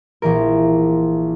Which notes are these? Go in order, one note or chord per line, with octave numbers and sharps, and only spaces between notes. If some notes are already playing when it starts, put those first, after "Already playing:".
A#1 E3 A#4